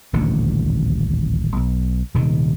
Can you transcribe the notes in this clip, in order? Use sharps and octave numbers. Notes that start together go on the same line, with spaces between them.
D#1 A1 D2 D3
B1
D#1 C3 D#3